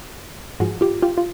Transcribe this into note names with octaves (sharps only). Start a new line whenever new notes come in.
G#2 F3 F#4 G#4
F4 G4
F4 G4
F4